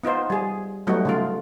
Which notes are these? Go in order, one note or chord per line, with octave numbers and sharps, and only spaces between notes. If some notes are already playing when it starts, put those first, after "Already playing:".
B3 D#4 F4 C5
G3 G#4
F#3 G3 A3 B3 D#4 F#4
C#3 A3 F4